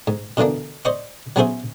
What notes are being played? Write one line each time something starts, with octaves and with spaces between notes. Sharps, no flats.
G#2
B2 D3 E3 A#3 D4
C5 D5 D#5 C#6
F#3 B3 C#4 G#4 C5 E5